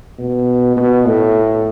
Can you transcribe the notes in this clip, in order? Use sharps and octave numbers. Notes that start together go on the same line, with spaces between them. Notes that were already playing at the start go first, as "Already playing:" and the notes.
B2
B2
A2